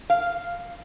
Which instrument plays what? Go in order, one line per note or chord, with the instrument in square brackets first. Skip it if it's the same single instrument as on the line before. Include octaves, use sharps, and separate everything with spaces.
[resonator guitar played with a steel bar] F5